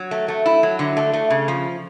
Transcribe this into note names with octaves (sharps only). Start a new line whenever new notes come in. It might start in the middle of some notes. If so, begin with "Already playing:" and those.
Already playing: F#3
A3
A3
E4
F#3
D3
A3
A3
C#3
F3